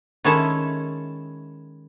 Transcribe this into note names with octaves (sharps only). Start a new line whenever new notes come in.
D#3 G#3 C#4 E4 A4 E5